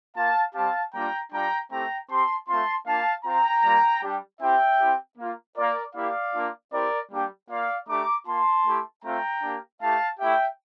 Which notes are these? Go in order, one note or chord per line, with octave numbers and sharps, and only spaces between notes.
A#3 F4 F5 A5
G3 C4 G4 F5 A5
G3 A#3 D4 F4 G5 A#5
G3 D4 F4 G5 A#5
A3 C4 E4 G4 G5 A#5
C4 G4 A5 C6
A3 C4 F4 A5 C6
A#3 D4 F4 F5 A5
C4 F4 G5 A#5
G3 A#3 F4
G3 D4 G4
C4 E4 G4 E5 G5
C4 E4 G4
A#3 F4
A#3 F4 A#4 D5
A#3 E4 G4 D5 F5
A#3 D4 F4
C4 E4 G4 A#4 D5
G3 A#3 D4 G4
A#3 F4 D5 F5
A3 D4 G4 A#5 D6
A#3 F4 A5 C6
A3 E4 G4
A3 C4 F4 G5 A#5
A#3 D4 G4
A3 E4 G4 F5 A5
A3 E4 G4 E5 G5